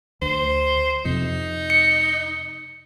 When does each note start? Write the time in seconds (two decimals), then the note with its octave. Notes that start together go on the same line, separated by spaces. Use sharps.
0.22 D2 C5
1.05 F2 C3 D#4
1.70 C#7